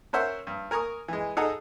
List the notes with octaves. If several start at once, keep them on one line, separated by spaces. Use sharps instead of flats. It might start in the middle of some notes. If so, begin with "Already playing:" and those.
C#4 A#4 C5 C#5 E5 F#5
G2
A#4 G#5 A#5 C#6 D#6
E3 G#3
D#4 G#4 A4 D#5 F#5 A#5